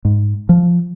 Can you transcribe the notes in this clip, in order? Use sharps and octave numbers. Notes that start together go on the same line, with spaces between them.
G#2
F3